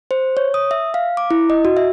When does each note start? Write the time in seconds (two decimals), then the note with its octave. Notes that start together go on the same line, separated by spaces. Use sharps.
0.11 C5
0.37 C#5
0.54 D#6
0.71 E5
0.94 F5
1.17 D6
1.31 E4
1.50 D#5
1.65 F#4
1.77 E5